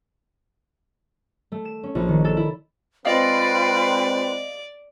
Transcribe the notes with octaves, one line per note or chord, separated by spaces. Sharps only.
A3
E7
C#4
A#1
D#3
A4
E4
G#3 C4 F4 B4 D5 D#5 F5 G5